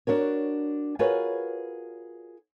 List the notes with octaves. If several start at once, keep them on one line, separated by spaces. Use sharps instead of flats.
D4 F#4 A#4 C#5
F4 F#4 G#4 A#4 B4 C#5